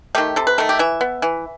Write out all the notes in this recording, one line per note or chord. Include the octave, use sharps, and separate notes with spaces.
D#3 A3 G4
C3 A4
B4
D#3 A3 A4
G4
E3 E5
B3
E3